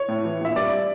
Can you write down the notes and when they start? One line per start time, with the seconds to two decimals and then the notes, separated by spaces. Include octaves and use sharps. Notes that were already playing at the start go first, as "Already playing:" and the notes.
Already playing: C#5
0.08 A2
0.25 E3
0.40 A#1 E5
0.56 G2 D5